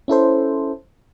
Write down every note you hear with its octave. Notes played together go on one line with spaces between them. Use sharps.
C#4 E4 A4 C5